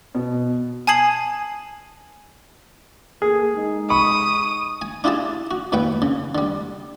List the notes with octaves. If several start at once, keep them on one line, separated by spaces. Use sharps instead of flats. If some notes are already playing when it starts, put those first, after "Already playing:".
B2
G#5 A5 D#6 G#6 C7 F#7
A#3 G#4 A4
G#3 D#4
B5 C#6 D#6
G#5
D4 E4 F4 G4 G#4 A5
F#4
D#2 A#2 B4 F#5 G5
C#3
D3 G3